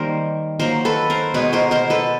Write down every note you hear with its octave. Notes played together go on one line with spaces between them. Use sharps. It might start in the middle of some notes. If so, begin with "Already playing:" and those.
Already playing: D#3 G3 A#3 A#4 C5
D#3 F#3 A#3 A#4 C5
A4 B4
A#4 C5
B2 G#3 B3 B4 C#5
A#4 C5
A#4 C5
A4 B4